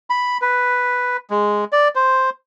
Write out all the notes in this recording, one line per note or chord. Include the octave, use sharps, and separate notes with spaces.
B5
B4
G#3
D5
C5